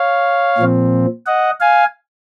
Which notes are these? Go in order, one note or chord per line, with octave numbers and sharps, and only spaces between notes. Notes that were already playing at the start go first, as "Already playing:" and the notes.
Already playing: C#5 F5
A#2 F3 C4
D#5 F#5
F5 G#5